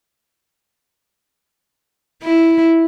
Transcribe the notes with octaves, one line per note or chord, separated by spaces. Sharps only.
E4